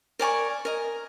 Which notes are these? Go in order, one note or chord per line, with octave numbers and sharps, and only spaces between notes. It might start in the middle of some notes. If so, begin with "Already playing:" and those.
A#4 D5 G#5 C#6
A#4 D#5